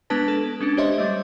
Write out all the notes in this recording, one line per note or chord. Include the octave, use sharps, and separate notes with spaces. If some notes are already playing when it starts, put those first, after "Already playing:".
G#3 B3 D4 B4 A5 A#6
A4
G#3 C#4 D4
G4 C5 C#5 D#5 E5 C6
G3 A3